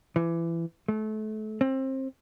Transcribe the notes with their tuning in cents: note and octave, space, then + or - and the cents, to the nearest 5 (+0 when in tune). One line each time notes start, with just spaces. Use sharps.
E3 +25
A3 -30
C4 +25